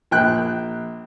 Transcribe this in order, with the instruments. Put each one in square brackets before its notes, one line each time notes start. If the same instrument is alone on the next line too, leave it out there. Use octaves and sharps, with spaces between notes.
[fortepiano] A#1 G5 F#6